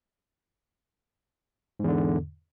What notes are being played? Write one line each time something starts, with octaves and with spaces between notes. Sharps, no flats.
E2 G#2 D3